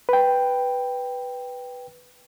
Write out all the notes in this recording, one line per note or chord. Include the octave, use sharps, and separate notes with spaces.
B4 G5